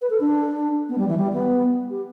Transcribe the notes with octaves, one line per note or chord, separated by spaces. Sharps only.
B4
A4
D4
B3
G3
E3
G3
B3
G4